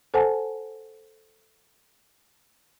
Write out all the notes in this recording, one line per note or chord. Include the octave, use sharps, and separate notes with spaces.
A4 C5 F#5 G#5 A5